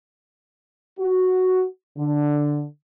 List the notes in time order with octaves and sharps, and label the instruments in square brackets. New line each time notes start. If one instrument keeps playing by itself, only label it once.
[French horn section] F#4
D3